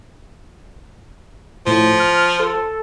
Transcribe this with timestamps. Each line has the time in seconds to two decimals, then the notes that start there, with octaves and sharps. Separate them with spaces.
1.67 A2 F3
2.00 F6
2.40 A4